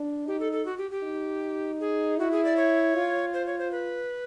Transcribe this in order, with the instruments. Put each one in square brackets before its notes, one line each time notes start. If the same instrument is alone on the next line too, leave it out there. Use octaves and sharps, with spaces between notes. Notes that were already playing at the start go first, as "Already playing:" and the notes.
Already playing: [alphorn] D4
[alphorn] D#4 [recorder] G4
[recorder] A4
A4
F#4
G4
G4
[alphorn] D#4
[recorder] G#4
[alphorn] E4 [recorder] F#4
[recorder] G#4
D5
C#5
[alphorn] F4
[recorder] C5
C#5
C5
B4